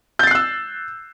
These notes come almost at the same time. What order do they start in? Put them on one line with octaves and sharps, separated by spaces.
G6 A6 C7 F#6 E6